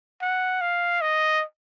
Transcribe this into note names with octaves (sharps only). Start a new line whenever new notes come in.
F#5
F5
D#5